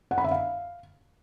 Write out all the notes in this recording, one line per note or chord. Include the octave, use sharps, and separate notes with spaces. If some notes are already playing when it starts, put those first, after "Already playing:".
F#5
B5
E5
F5